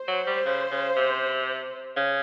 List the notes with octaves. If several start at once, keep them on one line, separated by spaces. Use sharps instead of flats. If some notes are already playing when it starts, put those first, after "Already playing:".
Already playing: C5
F#3
G3
C#3
C#3
C3
C#3